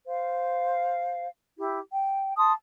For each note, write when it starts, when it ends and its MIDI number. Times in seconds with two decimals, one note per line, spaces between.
0.06 1.27 72
0.06 1.27 77
1.58 1.78 64
1.58 1.78 67
1.92 2.33 79
2.37 2.52 81
2.37 2.52 84
2.37 2.52 87